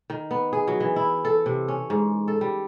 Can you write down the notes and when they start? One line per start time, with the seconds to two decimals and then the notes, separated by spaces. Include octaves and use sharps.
0.10 D#3
0.31 B3
0.53 G#4
0.67 F#3
0.80 E3
0.96 E4
1.25 A4
1.46 C3
1.68 C#4
1.90 G#2
2.28 A4
2.41 G3